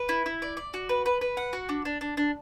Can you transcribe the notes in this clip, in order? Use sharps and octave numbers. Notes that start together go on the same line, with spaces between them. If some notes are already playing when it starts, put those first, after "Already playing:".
Already playing: B4
E4
E4
D5
D5
F#4
B4
B4
B4
F#5
F#4
D4
D4
D4
D4